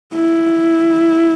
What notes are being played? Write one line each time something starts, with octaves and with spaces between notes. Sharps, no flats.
E4